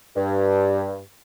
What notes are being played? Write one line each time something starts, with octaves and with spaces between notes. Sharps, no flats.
G2